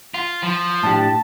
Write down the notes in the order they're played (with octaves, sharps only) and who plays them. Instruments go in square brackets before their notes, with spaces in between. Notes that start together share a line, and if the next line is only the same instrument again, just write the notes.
[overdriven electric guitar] F4
F3
[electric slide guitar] A2 D4 G4 [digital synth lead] A5